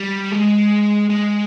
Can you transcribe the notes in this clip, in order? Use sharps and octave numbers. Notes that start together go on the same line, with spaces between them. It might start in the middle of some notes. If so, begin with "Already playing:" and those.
Already playing: G3
G#3
G#3